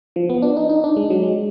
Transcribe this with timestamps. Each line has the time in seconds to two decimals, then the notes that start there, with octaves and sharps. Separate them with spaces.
0.16 F3
0.29 B3
0.42 D4
0.57 D#4
0.69 D#4
0.84 D4
0.96 G#3
1.10 F#3
1.23 G#3